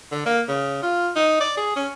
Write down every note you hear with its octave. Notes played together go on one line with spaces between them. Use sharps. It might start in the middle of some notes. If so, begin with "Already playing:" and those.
D3
A#3
C#3
F4
D#4
D5
G#4
C#4